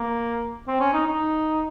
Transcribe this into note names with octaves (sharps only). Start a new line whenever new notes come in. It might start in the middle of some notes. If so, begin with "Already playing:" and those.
Already playing: A#3
C4
C#4
D#4
D#4